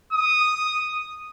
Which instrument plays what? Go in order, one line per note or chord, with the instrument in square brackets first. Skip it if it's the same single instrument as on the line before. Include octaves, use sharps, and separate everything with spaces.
[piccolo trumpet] D#6